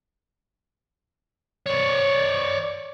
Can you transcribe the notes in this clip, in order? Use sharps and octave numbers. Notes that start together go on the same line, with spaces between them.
C#5 D5